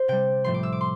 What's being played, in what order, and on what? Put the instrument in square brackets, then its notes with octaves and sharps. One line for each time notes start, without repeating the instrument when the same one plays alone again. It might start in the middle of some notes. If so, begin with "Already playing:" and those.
Already playing: [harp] C5
C3 G3 G5
A2 F3 A3 C6
D6
E6
D6
C6